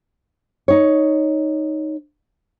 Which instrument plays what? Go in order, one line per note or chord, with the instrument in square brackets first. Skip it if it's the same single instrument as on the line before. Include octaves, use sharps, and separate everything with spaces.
[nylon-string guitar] D#4 C#5